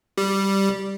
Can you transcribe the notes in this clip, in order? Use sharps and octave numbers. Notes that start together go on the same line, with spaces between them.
G3